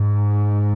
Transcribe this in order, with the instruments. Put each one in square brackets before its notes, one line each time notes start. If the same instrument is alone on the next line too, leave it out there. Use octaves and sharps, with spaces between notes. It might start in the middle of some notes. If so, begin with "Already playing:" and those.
Already playing: [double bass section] G#2